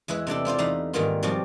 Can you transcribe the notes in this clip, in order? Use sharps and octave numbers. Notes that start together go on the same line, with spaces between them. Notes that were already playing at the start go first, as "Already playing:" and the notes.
E2 G#3 E4 B4
C3 A3 D4 A4
E4 F4 C5 D5
E2 A3 D#4 F5 A#5 B5
G#2 D#3 G3 A#3 B3 F4
B2 F3 G3 C4 D5